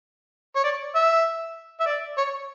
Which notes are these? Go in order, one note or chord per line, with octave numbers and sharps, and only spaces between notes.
C#5
D5
E5
E5
D5
C#5